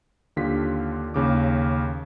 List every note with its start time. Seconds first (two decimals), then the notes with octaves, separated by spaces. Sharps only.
0.36 D#2 D3 F4 G4 B6
1.14 D#2 C#3 D6